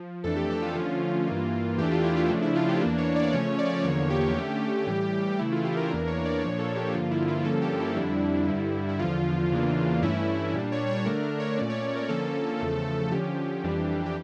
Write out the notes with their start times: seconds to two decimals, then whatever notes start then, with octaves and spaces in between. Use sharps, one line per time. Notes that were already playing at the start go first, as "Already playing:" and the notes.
Already playing: F3
0.24 F2 E3 A3 D4 A4
0.36 G4
0.50 A4
0.62 F4
0.75 D3 F3 A3 C#4 F4
1.27 G2 E3 A#3
1.78 E2 E3 A3 D4 G4
1.91 F4
2.04 E4
2.17 F4
2.30 C#3 F3 A3 D4
2.42 E4
2.55 F4
2.69 G4
2.81 E2 E3 A#3 D4
2.98 C#5
3.16 D5
3.33 C#3 F3 A3 C#4 C#5
3.59 D5
3.84 E2 D3 F3 A#3 C#5
4.10 G4
4.35 D3 A3 C#4
4.87 A2 E3 G3
5.39 C#3 E3 A3 E4
5.52 F4
5.64 G4
5.77 A#4
5.90 E2 E3 A#3 D4 A#4
6.08 C#5
6.25 D5
6.42 A#2 F3 A#3 D4 C#5
6.59 A4
6.76 G4
6.94 G2 D3 F3 A#3 F4
7.11 E4
7.28 F4
7.45 G2 D3 F3 A#3 C#4 A4
7.62 G4
7.80 E4
7.96 F2 D3 G3 D4
8.48 G2 D3 G3
8.89 E4
8.99 E2 D3 F3 F4
9.52 E2 C#3 E3 A#3 D4
10.02 G2 E3 A3 C#4 E4
10.54 A#2 G3 D4
10.72 C#5
10.88 C#5
11.06 D3 A3 D4 A#4
11.23 A#4
11.40 C#5
11.58 A#2 A3 C#4 D5
11.70 C#5
11.83 C#5
11.95 A#4
12.09 D3 F3 A#3 C#4 A4
12.60 E2 C#3 F3 A3
13.12 D3 F3 C#4 G4
13.64 F2 E3 G3 D4
14.06 G4